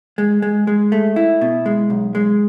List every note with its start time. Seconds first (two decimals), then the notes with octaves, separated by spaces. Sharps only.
0.18 G#3
0.42 G#3
0.67 G#3
0.92 A3
1.16 E4
1.41 B2
1.66 G#3
1.90 B1
2.15 G#3